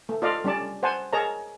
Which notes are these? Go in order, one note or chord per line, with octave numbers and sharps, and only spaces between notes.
A3
F4 A4 D5 D#5 F5
G3 C#4 D5 A5
C5 F#5 G#5 A5
G#4 A#4 C#5 D#5 A5 A#5